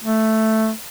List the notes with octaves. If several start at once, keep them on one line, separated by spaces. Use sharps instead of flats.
A3